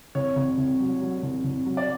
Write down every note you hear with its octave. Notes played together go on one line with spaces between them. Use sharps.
C2 C#5
C2
C2
F#3
F#3
C2
C2
F#3
D5